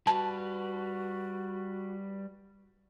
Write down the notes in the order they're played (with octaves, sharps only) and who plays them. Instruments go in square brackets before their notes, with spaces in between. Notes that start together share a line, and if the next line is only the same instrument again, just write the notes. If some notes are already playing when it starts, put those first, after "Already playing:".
[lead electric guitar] G3 B4 [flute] F#4 [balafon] A5